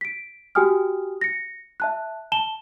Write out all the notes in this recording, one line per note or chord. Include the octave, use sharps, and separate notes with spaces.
B6 D7
F#4 G4 G5 G#5 D#6 F6
A#6 C#7
E5 A5 F#6
A5 E7 G7